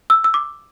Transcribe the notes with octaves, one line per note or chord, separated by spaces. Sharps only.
E6
E6
D6